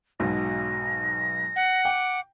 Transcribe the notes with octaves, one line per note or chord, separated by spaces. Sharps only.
B1 G#2 B2 A#6
F#5
G5 D6